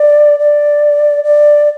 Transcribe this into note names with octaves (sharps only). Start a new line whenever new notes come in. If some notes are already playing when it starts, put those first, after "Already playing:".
Already playing: D5
D5
D5